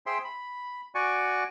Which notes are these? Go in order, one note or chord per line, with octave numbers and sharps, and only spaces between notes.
G#4 C5 E5 G5 C6
B5
F#4 D5 G#5 C#6